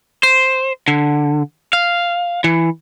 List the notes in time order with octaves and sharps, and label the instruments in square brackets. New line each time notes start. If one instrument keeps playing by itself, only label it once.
[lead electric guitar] C5
D3
F5
E3